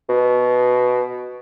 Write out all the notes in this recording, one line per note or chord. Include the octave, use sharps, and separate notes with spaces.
B2